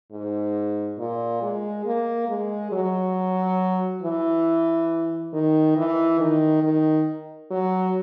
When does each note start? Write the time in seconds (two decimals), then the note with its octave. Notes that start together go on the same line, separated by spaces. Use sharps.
0.12 G#2
0.99 A#2
1.42 G#3
1.86 A#3
2.29 G#3
2.72 F#3
4.03 E3
5.33 D#3
5.77 E3
6.20 D#3
6.64 D#3
7.51 F#3